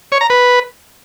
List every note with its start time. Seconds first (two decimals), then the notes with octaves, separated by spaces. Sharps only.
0.12 C#5
0.21 A#5
0.30 B4